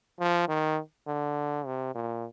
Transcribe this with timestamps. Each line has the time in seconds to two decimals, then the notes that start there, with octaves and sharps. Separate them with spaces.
0.20 F3
0.48 D#3
1.07 D3
1.66 C3
1.95 A#2